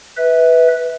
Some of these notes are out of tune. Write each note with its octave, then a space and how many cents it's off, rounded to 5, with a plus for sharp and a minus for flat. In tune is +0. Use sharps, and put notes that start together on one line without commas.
B4 +0 E5 -25